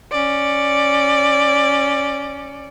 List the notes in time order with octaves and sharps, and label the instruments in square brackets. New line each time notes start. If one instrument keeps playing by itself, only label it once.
[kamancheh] C#4 D5